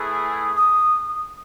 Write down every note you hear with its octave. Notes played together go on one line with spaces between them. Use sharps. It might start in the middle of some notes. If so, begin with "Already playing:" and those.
Already playing: A3 E4 G#4 B4
D#6